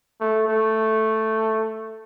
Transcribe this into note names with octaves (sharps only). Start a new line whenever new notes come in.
A3
A3